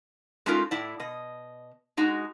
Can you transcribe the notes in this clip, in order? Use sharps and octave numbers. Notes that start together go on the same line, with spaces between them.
G#3 A3 C#4 D#4 F4 A#4
A2 E4 D5
B2 D#5
G#3 D#4 F#4